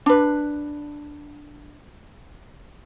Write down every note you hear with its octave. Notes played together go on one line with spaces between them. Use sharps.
D4 B4